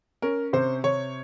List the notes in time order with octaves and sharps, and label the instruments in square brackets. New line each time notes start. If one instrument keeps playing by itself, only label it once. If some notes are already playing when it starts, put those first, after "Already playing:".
[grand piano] C#4 A#4
C3 C5
C3 C#5